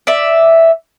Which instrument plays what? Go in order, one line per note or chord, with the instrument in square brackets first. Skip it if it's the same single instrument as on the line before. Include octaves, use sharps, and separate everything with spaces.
[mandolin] D5 E5